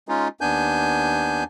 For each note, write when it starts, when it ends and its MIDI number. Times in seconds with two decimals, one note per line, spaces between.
0.08 0.28 56
0.08 0.28 61
0.08 0.28 63
0.08 0.28 65
0.41 1.44 39
0.41 1.44 59
0.41 1.44 62
0.41 1.44 80
0.41 1.44 91